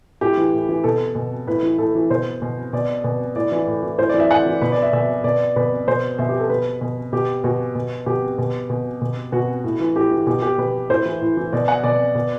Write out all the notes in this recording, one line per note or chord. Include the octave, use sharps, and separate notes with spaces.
A2 G4
E3
A2
E3
B2 A4
B2
A2 B4
E3
A2 A4
E3
B2 C5
B2
B2 D5
B2
A2 D5
E3
A2
E3
A2 C5
E3 D5
E5
A2 F#5
E3 D5
B2 B4
D5
E5
B2 E5
B2 D5
B2 B4
B2 C5
B2 E5
G4
A4
B2 B4
B2
B2 G4
B2 F#4
B2
B2 G4
B2
B2
B2
B2 F#4
A2
E3
A2 G4
E3
B2 G4
G4
B2 B4
A2 C5
E3
A2
E3
B2 D5
F#5
B2 D5
B2